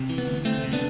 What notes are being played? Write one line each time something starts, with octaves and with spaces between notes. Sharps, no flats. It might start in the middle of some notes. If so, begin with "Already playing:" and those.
Already playing: C3
E3
B3
D2
D2 A3 C4
C3
B3 D4